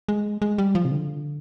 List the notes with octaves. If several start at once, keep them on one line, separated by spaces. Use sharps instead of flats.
G#3
G#3
G3
F3
C3
D3